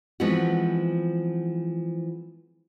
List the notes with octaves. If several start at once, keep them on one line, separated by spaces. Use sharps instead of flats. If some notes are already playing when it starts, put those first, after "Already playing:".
E3 F3 G#3 B3 C4 F#4